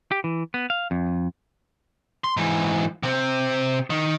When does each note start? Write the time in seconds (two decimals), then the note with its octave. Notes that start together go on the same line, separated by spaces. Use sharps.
0.11 G4
0.24 E3
0.54 B3
0.70 F5
0.91 F2
2.24 C6
2.37 G#2 E3
3.03 C3 C4
3.90 D#3